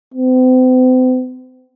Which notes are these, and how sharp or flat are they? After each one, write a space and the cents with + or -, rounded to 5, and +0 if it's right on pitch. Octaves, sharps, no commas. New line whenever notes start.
C4 -40